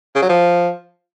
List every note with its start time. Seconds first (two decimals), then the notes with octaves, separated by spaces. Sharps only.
0.15 C#3
0.22 F#3
0.29 F3